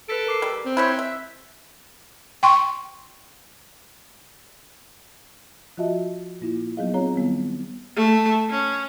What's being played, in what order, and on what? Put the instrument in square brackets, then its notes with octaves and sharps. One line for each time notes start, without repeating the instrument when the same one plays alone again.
[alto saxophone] A4 [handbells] B4 B6 D7
[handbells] A#4 D6 C7
[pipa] G3
[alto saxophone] C4
[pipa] E4 C5 C#5 [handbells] F#6 B6
[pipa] E5
[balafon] G5 C6 C#6
[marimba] F3 F4 F#4 D#5 E5 A5
A#2 A#3 E4 F4
F#3 B3 D#4 G#4 D#5 F5
C4 F4 G#4 C#5 F5 A#5
D#3 G3 B3 E4
[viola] A3
C#4